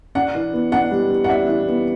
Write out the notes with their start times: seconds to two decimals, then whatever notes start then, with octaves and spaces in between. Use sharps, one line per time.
0.15 D4 F#5
0.35 E3
0.53 B3
0.72 D4 F#5
0.91 G3
1.10 E3
1.24 F#5
1.29 D4 E5
1.48 E3
1.67 B3